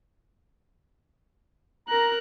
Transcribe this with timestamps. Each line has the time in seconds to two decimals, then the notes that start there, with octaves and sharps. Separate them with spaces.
1.89 A#4 A#5 F#6